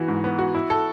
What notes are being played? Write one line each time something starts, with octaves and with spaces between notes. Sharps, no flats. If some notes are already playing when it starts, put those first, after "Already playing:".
Already playing: E3 B3 F#4
G#2
B3
F#4
E4
A4